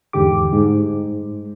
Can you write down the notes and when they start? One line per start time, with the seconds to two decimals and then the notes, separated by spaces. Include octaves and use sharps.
0.13 E2 G#2 D3 G4 D6
0.53 G#2